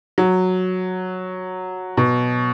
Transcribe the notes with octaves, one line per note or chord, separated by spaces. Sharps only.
F#3
B2